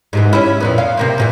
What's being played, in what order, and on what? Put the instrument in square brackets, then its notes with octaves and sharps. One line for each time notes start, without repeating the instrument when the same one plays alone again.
[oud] G#2 C3 E3
C#4 E4
F2 A#2 B3
F5
C3 A#3 C4
E2 A#2 B3